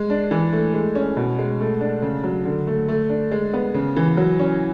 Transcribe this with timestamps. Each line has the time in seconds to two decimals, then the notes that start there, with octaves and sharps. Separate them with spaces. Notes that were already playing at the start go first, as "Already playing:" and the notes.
Already playing: G#3
0.10 D4
0.31 E3
0.53 A3
0.74 G#3
0.95 C#4
1.17 B2
1.39 G#3
1.60 A3
1.81 D4
2.02 C#3
2.24 F#3
2.45 D3
2.67 A3
2.88 A3
3.09 D4
3.32 G#3
3.53 B3
3.74 C#3
3.96 E3
4.17 F#3
4.39 C#4